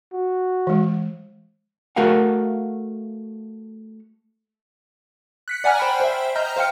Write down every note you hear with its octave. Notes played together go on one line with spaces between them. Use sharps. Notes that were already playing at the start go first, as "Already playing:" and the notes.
F#4
E3 G#3
A3 F#4 A#4 F5 F#5
F#6 B6 C#7
D5 F#5 G#5 A#5 F6
C5 G5 B5
C5 E5
D#5 A#5 F6 G6
C5 F5 G5 F6 C#7